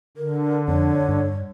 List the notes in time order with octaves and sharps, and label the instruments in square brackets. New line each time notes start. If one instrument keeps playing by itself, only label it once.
[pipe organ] D3 [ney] A#4
[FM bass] F2 [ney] C#5
[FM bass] G2